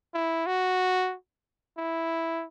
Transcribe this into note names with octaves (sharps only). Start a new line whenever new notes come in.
E4
F#4
E4